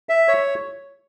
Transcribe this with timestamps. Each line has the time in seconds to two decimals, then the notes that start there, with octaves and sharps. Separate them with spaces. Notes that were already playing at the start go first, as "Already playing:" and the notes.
0.09 E5
0.28 C#5